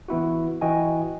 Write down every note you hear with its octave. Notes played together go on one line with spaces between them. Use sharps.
E3 B3 E4 F#4
E3 E4 F#4 D#5 G5 G#5